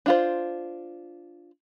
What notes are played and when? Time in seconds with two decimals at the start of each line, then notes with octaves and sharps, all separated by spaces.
0.06 D4 F4 C5